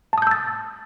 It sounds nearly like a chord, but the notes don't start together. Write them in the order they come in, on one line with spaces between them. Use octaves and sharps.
A5 D#6 G6 E6 A6